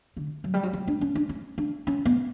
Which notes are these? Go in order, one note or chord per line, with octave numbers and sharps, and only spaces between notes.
D3
F#3
G3
F#3
G3
D4
C#4
D4
C#4
D4
C#4
B3